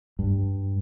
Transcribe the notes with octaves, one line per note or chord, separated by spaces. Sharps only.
G2